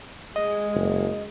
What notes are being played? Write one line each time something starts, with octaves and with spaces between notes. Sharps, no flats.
G#3 D#5
F#1